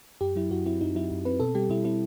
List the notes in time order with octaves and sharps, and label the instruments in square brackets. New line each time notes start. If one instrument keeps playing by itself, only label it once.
[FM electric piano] F#2 G4
F#3 E4
F#2 F#4
C4 E4
F#2 D#4
F#3 E4
F#2
C4 B4
B2 A4
G3 G4
B2 E4
C4 E4